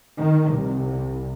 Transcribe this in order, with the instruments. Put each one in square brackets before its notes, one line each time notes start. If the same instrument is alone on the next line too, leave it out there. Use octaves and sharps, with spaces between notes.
[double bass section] D#3
C2